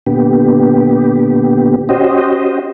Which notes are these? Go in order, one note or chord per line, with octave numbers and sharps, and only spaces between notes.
A#2 D3 B3 G4
C#4 F#4 G4 C5 D#5